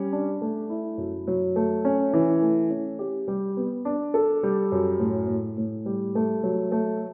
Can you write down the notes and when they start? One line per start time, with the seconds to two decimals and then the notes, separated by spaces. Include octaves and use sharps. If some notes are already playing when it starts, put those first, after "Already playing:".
Already playing: G3 C#4
0.13 D4
0.41 A3
0.70 E4
0.98 F#2
1.28 F#3
1.56 A3
1.85 C#4
2.13 E3
2.42 A3
2.70 C#4
2.99 G4
3.28 G3
3.57 B3
3.85 D4
4.14 A4
4.43 G3
4.72 F#2
5.00 A2
5.28 A2
5.58 A2
5.86 G3
6.15 A3
6.43 F#3
6.72 A3